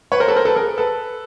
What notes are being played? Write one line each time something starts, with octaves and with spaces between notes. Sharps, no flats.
B4 C#5
A#4 C5
A4 B4
A#4 C5
A4 B4
G#4 A#4
A4 B4